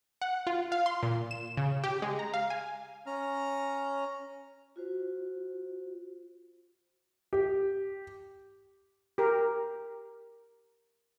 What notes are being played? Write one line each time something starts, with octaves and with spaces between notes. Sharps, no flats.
F#5
F4
F5
C6
A#2
E7
C#3
G4
G#3
A#5
F5
G#5
C#4 A#5 F6
F4 F#4 C5
G4
G4 A#4